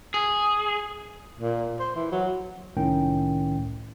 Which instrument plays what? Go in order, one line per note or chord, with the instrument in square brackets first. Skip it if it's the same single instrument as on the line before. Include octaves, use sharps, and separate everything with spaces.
[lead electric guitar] G#4
[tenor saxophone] A#2
C5
E3
F#3
[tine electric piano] C2 A2 D#3 C#4 G5